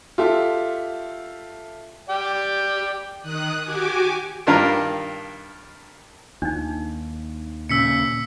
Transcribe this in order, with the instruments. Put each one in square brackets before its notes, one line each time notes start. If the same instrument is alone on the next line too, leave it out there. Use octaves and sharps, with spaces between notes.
[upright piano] F4 G4 A4 E5
[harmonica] D5 G5
[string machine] D#3 D#6 F#6
F#4 G4 G#5 D6
[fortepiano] G2 D#3 D4 F4 A#4
[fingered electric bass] D#2 [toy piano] D4 D#4
[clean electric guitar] A#2 C#3 [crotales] E6 B6 C#7